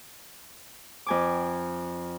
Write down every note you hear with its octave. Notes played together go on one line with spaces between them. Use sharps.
F2 G#5 D6